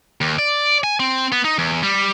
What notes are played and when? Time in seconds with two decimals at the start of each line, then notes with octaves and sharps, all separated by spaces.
0.21 D#2
0.39 D5
0.84 G#5
1.00 C4
1.32 B3
1.45 D#4
1.58 E2
1.83 G3